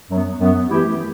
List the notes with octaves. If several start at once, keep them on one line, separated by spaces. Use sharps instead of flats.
F#2 F#3 B3
F#2 F#3 B3
E3 A3 E4 G4